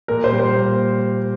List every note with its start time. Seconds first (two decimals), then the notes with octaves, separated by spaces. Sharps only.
0.08 A#2 A#4
0.24 C5
0.32 G3
0.40 C5
0.55 A#3